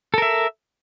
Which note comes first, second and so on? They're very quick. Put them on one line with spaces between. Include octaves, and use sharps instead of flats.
A4 A#4 E5